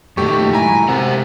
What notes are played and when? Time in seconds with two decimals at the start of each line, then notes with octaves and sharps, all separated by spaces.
0.17 F#2 A#2 D#3 A3 G4 C#6
0.53 A2 F#3 G#3 E4 G#5 A#5
0.89 C3 A#4 C5 F#5